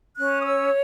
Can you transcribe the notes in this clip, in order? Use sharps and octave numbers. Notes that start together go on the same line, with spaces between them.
C#4 F#6
D#6
C#5 E6